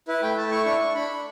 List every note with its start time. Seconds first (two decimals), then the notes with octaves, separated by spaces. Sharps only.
0.08 E4 B4
0.22 A3 G5
0.37 A3 A5
0.51 E4 C#6
0.66 D4 C#6
0.81 D4
0.95 D4 B5
1.10 D4